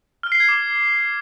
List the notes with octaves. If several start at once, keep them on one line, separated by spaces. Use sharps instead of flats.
F6
C7
G#6
D6